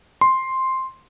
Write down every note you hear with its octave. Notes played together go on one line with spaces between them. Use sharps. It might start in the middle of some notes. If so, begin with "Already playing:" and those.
C6